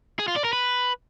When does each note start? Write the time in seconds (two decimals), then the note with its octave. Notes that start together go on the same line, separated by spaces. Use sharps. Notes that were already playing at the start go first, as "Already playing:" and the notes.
0.19 G#4
0.28 F4
0.36 D5
0.44 A#4
0.53 B4